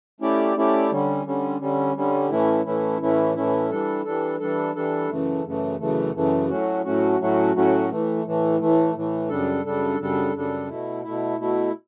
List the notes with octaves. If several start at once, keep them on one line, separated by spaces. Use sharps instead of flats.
A3 C#4 E4 G4 D5
A3 C#4 E4 G4 D5
D3 G3 C#4
D3 G3 C#4
D3 G3 C#4
D3 G3 C#4
A2 E3 A3 C#4 E4
A2 E3 A3 C#4 E4
A2 E3 A3 C#4 E4
A2 E3 A3 C#4 E4
E3 G3 D4 A4
E3 G3 D4 A4
E3 G3 D4 A4
E3 G3 D4 A4
F#2 C#3 E3 A3
F#2 C#3 E3 A3
F#2 C#3 E3 A3
F#2 C#3 E3 A3
A2 F#3 A3 C#4 F#4
A2 F#3 A3 C#4 F#4
A2 F#3 A3 C#4 F#4
A2 F#3 A3 C#4 F#4
A2 E3 A3
A2 E3 A3
A2 E3 A3
A2 E3 A3
F#2 C#3 G3 D4 A4
F#2 C#3 G3 D4 A4
F#2 C#3 G3 D4 A4
F#2 C#3 G3 D4 A4
B2 A3 E4
B2 A3 E4
B2 A3 E4